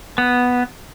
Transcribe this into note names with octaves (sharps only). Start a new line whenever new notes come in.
B3